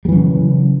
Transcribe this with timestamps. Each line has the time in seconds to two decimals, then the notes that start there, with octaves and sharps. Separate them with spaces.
0.05 G3
0.09 E3
0.12 F#3
0.15 C#3